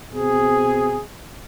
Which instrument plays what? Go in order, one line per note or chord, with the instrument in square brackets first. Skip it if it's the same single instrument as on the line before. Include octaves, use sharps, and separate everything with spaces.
[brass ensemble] B2 C4 G#4